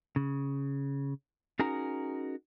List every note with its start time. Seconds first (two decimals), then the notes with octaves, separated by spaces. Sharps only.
0.16 C#3
1.59 C#4 D#4 F#4 G#4 A#4 A#5